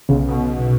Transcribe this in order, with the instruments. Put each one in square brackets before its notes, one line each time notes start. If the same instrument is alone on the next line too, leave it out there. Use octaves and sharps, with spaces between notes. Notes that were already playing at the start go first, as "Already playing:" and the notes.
[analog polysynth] B1 [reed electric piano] C#3
[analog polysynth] B2